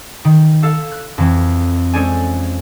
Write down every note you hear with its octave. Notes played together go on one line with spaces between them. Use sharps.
D#3
A4 F5 E6
F#6
F2 E3 C4
G#3 C#4 A4 C5 D5 G#5